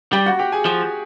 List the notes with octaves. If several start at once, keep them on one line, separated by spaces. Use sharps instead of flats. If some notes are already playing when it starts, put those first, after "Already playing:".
G3 G4 G5
F#4 F#5
G4 G5
G#4 G#5
F3